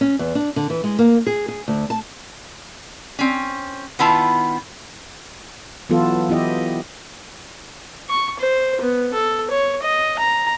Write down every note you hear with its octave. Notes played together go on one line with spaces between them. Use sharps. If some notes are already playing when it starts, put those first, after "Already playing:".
C#4
E2
D4
D3
E3
G#3
A#3
G#4
G#4
D2
A5
C4 C#4
D#3 B3 E4 F4 A5
E3 F#3 B3 F4 A4
E3 B3 E4 G4 D#5
C#6
C5
B3
A4
C#5
D#5
A#5